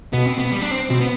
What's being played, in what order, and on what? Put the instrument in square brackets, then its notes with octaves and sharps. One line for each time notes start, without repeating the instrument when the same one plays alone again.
[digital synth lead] B2 [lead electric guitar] B3
[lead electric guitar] C4
B3
G3
D4
C4
[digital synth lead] B2 [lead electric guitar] C4
[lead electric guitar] B3